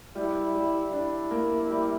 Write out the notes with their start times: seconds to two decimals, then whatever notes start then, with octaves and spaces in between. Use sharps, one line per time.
0.15 G3 E4
0.55 G3
0.93 D4 E4
1.31 A#3
1.70 G3